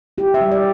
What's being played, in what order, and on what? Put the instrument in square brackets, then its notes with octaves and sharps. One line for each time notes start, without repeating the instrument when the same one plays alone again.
[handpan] E4 G4
E5
G3
D5